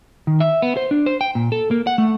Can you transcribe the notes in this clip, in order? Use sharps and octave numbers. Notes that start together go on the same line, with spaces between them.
D#3
E5
B3
C5
D4
C5
G5
A#2
A4
A#3
F#5
A3